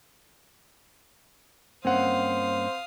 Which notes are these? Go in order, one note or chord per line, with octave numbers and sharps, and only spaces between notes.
G2 A#3 C4 C#4 C5 F5 F#5 D#6